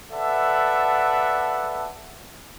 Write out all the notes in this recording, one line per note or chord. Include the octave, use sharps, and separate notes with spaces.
A4 B4 D5 E5 F#5 A5